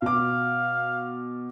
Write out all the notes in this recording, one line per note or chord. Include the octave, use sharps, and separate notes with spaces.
B2 F5 D6